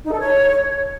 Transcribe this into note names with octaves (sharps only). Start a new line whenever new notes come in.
D#4
A4
C#5